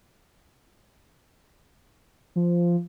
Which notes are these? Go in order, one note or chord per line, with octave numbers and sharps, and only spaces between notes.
F3